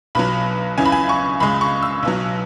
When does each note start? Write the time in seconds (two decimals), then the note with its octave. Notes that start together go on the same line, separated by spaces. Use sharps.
0.15 B1 B2 F#3 B5
0.78 C#2 C#3 E3 C#4 G#5
0.85 B5
0.92 G#5
1.09 C#6
1.40 C#2 C#3 G#3 B5
1.61 C#6
1.83 E6
2.03 B1 B2 F#3